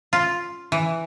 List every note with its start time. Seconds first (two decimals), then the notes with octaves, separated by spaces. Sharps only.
0.13 F4
0.72 E3